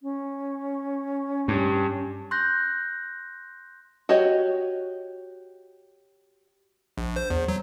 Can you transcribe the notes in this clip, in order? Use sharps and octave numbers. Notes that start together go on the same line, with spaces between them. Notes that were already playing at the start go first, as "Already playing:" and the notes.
C#4
G2
C6 F#6 G6 A#6
F#4 G4 C#5 D#5
A#1
C5
E2
F#3